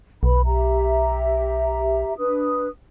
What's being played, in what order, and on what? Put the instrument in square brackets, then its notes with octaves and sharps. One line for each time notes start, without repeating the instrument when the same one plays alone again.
[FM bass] B1 [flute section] B4 B5
[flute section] G4 E5 A#5
D4 B4 D#6